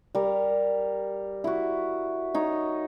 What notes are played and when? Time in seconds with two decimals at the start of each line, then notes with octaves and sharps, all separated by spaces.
0.15 G3 A#4
1.44 E4 F#4
2.34 D#4 C#5